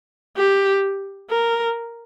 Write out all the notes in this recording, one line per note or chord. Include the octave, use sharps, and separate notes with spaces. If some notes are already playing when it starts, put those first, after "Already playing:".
G4
A#4